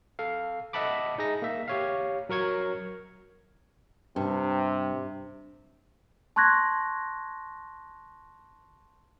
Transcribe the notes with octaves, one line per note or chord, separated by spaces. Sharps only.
A4 F5
D#5 E5 F#5 A5 B5 D6
D#4 G#4 A#6
A#3 E5
G4 C#5 F5
F#3 A#4 C#6 G#6
G2 C3
A5 C6 C#6 F#6 G#6 A#6